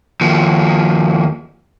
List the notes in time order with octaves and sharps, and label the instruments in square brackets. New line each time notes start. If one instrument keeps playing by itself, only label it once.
[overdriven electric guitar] D#2 F3